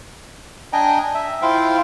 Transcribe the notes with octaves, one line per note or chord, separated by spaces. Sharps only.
D4 D#5 G5 G#5 A#5
E5
E4 F4 C5 F5 G5